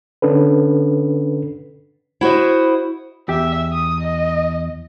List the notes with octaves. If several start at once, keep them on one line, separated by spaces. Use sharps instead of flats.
D3 C#4 D4 A4 B4
E4 F#4 C5 D#5
E2 G4 E5
D#6
D#5